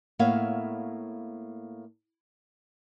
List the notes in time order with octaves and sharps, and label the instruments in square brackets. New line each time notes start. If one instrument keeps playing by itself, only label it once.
[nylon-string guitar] A2 A#3 B3 C#5 E5 F5